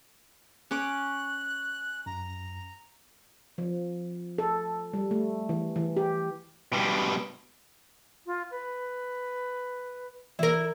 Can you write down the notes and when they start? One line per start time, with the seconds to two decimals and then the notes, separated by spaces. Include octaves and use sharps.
0.71 C#4 C#5 D6 F#6
2.06 F#2 A#5
3.58 F3
4.38 A4
4.94 G3
5.11 A3
5.49 E3
5.76 E3
5.97 G4
6.73 B2 G3
8.26 F4
8.51 B4
10.39 E3 E4 A#4